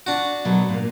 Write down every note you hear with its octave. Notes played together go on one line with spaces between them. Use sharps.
D4 F#4
B2 F#3 A4
A#2 A#3